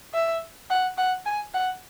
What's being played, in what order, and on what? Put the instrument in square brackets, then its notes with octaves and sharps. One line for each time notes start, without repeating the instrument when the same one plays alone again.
[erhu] E5
F#5
F#5
G#5
F#5